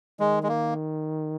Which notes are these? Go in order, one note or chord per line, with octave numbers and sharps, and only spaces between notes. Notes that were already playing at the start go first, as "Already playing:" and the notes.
D#3 G#3
G#3
A#3